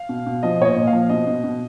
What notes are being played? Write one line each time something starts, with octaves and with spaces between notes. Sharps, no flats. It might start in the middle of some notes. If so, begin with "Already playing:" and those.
Already playing: F5
B2
B2
F3 D#5
A#2 C#5
D#5
A#2
F5
F3
B2 D#5
B2
B2